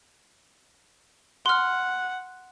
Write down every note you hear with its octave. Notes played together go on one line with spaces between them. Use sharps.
F#5 C6 F6